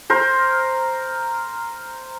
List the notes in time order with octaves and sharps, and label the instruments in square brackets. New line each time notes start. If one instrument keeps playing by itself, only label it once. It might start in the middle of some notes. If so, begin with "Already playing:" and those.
[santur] A#4 C5